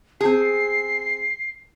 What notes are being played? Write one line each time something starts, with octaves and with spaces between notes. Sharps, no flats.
C4 G#4 C7